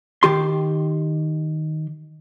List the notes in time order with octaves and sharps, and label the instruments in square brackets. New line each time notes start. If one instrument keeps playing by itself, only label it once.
[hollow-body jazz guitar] D#3 G4 C6